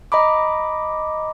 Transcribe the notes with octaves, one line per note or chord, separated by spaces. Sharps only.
D#5 A#5 B5 D6